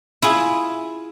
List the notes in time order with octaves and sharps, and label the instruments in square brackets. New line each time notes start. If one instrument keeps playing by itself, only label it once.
[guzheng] E4 F4 G#4